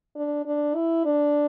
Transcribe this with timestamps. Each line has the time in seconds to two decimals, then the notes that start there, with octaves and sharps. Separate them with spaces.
0.16 D4
0.46 D4
0.75 E4
1.05 D4